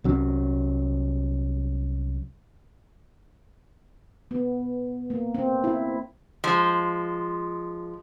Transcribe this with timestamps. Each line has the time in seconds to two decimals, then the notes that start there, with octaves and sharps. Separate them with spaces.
0.04 C2 F#3 C#4
4.31 B3
5.10 A#3
5.35 C4
5.64 E4
6.44 F3 G#3